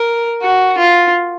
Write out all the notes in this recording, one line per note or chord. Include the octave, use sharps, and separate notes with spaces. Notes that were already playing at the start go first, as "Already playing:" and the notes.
Already playing: A#4
F#4
F4